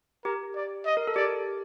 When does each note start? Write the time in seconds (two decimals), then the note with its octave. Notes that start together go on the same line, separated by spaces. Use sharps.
0.25 G4 A#4
0.56 D5
0.86 D#5
0.97 A#4
1.07 A4
1.16 G4 D5